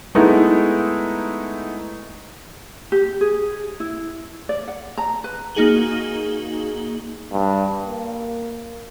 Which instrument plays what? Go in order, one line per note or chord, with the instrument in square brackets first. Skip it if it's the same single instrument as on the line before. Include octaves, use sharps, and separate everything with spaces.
[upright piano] G#3 A3 B3 D#4 E4
[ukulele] G4
G#4
E4
D5
F#5
A#5
B4
[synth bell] A#3 D#4 F#4 G#4 F#7 G7
[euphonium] G2
A#3